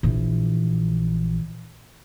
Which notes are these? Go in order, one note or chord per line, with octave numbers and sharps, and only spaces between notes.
A#1 E3